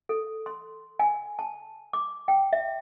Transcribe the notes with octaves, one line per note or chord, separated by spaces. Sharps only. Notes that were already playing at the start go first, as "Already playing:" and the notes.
A4
C6
G#5
A5
D6
G5
E5